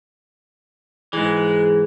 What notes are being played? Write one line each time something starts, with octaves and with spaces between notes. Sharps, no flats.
G#2 E3 G#3